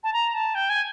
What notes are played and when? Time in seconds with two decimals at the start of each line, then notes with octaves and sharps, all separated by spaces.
0.04 A5
0.13 A#5
0.34 A5
0.55 G5
0.69 G#5